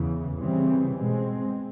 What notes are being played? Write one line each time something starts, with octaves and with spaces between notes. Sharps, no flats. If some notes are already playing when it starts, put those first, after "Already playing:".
Already playing: E2 C#3 E3
C#3 E3 G3 C4
B2 G#3 C4